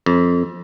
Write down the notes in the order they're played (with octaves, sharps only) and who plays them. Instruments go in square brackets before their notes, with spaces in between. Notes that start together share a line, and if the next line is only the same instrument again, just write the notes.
[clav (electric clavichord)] F2